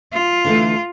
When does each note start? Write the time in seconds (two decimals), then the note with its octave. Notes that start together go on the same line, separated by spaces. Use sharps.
0.13 F4
0.45 D3 E3 A3